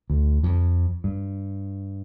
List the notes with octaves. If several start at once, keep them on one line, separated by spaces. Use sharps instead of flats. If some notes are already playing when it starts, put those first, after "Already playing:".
D2
F2
G2